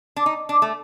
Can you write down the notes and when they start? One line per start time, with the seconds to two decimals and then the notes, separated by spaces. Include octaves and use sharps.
0.16 D4
0.26 D#4
0.49 D4
0.62 A3